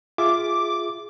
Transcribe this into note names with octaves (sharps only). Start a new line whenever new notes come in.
F4 G#4 E5 D6